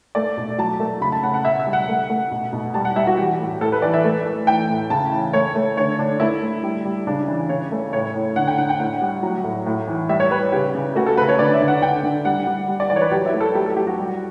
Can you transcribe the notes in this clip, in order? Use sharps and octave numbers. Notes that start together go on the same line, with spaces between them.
A3 D5
B2
F#3 A5
A3
C#3 B5
A5
C#3 F#5
F#5
B2 E5
E5
G3
F#5
A3
A3
B2
B2
G3 A5
F#5
G3 E5
F#4
E3 G4
A2
A2 A4
B4
E3 D5
E5
A3
A3
E3 G5
A2
C#3 A5
E3
A3 C#5
A3
D3 C#5
D3 D4
A3 E4
A3
G3
G3
C#3 D4
E3
C#3 C#5
A3
A2 C#5
A2
D3 F#5
G5
D3 F#5
G5
A2 F#5
G3
F#3
A2
A2
E3
G3 E5
C#5
G3 B4
C#3 G4
C#3
A3 F#4
A4
C#3 B4
C#5
D3 D5
E5
D3
F#5
D3 G5
D3
G3 F#5
G3
G3
D5
E3 D5
C#5
B4
F#3 G4
E4
A3
A4
F#3 G4
A4
F#3 G4
F#4
G3